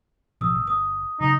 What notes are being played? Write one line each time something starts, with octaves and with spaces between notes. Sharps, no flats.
A1 B2 F3 D#6 E6
G1
D#6
C#3 F#3 D#4